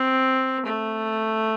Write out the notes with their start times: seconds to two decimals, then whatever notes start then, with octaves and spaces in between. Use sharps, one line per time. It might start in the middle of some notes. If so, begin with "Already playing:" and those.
Already playing: C4
0.66 A3